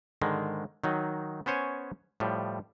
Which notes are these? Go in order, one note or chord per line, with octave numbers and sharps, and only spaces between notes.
G#2 D3 D#3 G#3
D#3 F#3 D#4
B3 C#4 C5 C#5 G#5
A2 F3 G3